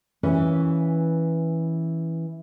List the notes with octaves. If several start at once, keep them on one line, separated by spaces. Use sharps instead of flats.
E3 C#4 F4 B4